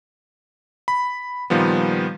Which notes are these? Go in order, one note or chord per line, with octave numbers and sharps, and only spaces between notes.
B5
A#2 D#3 F3 G3 B3